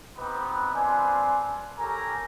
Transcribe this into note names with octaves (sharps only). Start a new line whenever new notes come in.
B3 C4 D#4 G4 B4
C4 D4 F4 B4 G#5
G4 A4 A#4 C#5 G#5 A#5